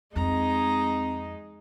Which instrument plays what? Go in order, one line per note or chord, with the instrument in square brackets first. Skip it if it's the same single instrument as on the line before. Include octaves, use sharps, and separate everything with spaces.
[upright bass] F2 [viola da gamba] G#3 D#4 [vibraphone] C4 [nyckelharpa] A#5